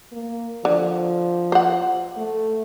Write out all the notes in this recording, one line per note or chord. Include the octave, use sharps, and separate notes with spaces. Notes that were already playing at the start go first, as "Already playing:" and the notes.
A#3
D3 F3
C5 F#5
A3